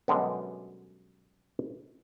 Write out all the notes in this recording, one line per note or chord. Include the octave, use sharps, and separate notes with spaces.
F#2 B2 D3 G3 G#3